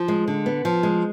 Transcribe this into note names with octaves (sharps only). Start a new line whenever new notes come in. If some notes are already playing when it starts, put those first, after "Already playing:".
Already playing: F3
G#3
D3
B3
F3
G#3